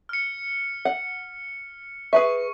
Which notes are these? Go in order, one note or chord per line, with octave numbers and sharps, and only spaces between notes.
F6 C#7
F#5
G#4 B4 E5 C#6